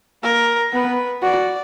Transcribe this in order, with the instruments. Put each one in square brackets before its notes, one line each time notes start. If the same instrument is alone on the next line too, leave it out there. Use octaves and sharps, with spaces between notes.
[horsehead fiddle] A#3 [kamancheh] A#4
[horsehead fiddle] B3 [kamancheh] B4
[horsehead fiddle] F#4 [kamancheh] D5